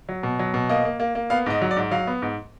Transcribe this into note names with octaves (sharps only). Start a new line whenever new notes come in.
F#3
B2
F#3
B2
A#3 D#5
A#3
A#3
A#3
B3 F5
G#2 D#5
F#3
D5
G#2
F#3 F5
B3
G#2